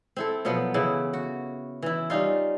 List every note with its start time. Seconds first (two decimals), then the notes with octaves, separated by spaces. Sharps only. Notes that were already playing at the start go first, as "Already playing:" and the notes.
0.16 C4 E4 A4
0.45 B2 F3 F#3 B3
0.74 C#3 E3 E4
1.13 F#4
1.82 E3 E4
2.10 G3 C#4 D#4 F4